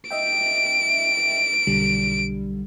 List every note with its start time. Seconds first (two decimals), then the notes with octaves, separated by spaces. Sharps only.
0.11 D#5 E5 G5 D7
1.67 B1 D3 G3